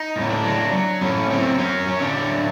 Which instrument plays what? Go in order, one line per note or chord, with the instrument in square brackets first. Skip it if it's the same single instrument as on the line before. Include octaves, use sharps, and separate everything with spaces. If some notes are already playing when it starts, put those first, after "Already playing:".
Already playing: [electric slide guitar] D#4
A2
C#4
D4
F#3
F#3
A2 C#4
F#3 C4
F#3 C#4
F#3
D4
F#3